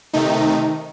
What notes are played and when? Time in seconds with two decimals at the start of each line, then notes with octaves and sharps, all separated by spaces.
0.13 C3 D#3 A3 D#4